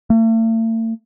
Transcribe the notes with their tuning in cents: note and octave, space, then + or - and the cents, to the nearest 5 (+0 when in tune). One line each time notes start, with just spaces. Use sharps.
A3 +45